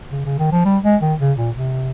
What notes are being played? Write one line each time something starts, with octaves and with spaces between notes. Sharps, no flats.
C#3
C#3
D#3
F3
G3
G#3
D#3
C#3
A#2
C3